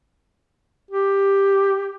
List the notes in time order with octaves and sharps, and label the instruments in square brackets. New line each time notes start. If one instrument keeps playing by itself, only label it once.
[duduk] G4